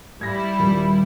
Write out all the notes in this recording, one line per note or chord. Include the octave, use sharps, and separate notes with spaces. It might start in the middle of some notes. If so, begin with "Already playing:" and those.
G3 E4 G#6 A#6
D#1